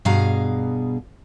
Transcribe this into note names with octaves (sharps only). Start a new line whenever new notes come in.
G2 B2 G#4 F5 A#5